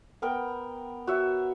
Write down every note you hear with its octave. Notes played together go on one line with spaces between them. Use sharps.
B3 A#4 G5
F#4 C#5 E5